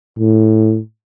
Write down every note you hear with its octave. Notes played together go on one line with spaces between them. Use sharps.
A2